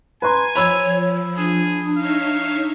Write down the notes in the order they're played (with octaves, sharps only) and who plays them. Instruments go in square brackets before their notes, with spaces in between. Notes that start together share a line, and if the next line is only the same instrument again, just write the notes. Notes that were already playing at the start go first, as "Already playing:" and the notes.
[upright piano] B4 A#5 C6 [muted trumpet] G#5 [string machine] G#6
[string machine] F3 [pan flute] C#5 [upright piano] B5 E6 G#6
[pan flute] D4 [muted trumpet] G#4
[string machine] D#4 C#5 E5 [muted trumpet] F5